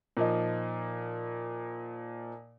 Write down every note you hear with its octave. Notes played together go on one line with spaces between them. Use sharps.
A#2 F3 D#4